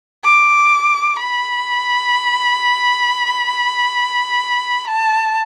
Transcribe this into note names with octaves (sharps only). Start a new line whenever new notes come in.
D6
B5
A5